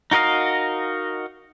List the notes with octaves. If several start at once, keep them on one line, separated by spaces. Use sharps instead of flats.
D#4 F#4 A#4 D#5 F5